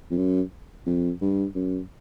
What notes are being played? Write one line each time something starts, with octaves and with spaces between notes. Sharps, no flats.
F2
F#2
F2
G2
F#2